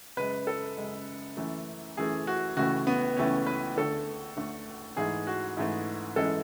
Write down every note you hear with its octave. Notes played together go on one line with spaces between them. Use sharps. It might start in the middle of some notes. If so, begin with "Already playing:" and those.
F#2 C#3 G#3 B4
A4
F#2 C#3 G#3
F#2 E3 A3
F#2 E3 A3 G#4
F#4
C#2 C#3 E3 A3 F#4
B3
C#2 C#3 E3 A3 C#4
B4
D2 D3 A3 A4
D2 D3 A3
G#2 E3 A3 G#4
F#4
G#2 E3 A3
F#2 E3 G#3 A4